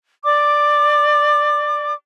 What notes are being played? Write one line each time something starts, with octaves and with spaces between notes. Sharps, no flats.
D5 D6